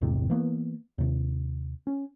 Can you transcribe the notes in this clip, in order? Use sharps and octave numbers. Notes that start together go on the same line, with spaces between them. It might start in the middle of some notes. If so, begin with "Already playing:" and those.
A#1 E2 G#2 C3
E3 A#3 B3
D#2 C3
C#4